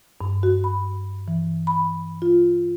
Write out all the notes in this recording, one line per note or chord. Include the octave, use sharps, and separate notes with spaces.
G2
F#4
B5
E3
B5
F4